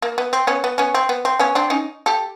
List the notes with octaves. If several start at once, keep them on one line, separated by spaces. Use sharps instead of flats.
A#3
B3
C4
B3 C#4
B3
B3 C#4
C4
B3
C4
B3 C#4
C4 D4
C#4 D#4
G4 A4